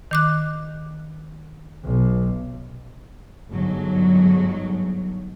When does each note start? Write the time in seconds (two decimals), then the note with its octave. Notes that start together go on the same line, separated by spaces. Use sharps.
0.11 D#3 D6 F#6
1.85 B1
3.51 G1 G#2 F#3